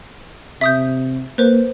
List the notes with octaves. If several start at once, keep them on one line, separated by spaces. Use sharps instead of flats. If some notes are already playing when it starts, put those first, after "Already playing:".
C3 E5 D#6 G6
A#3 B4 C5